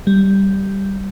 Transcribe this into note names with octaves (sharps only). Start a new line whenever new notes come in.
G3